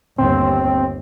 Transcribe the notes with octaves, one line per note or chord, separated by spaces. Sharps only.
G1 D#2 C4